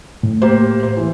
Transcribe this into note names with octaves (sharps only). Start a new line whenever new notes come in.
A2
A#3 G4 C5
C5
E3